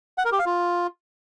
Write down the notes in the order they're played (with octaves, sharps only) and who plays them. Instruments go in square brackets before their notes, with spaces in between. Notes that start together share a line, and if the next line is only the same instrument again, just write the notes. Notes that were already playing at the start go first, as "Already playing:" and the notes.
[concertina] F#5
A#4
G4
F5
F4